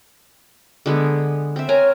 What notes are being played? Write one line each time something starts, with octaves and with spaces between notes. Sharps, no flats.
D3 G#3 B3
C4 E5
A#4 C#5 G#5 A#5